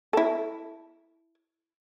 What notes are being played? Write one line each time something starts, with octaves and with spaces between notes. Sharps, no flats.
E4 A4